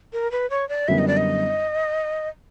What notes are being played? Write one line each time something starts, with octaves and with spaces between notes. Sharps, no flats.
A#4
B4
C#5
D5
F#2 D3 G3 B3 E4 E5
D#5
D5
D#5